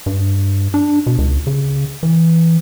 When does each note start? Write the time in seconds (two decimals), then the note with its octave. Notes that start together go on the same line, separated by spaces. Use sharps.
0.06 G2
0.74 D4
1.06 B2
1.18 C#2
1.47 C#3
2.03 E3